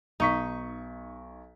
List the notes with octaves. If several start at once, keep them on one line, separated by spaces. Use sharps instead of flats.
B1 D#4 C#6 B6